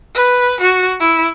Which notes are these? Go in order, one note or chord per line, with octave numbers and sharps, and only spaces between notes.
B4
F#4
E4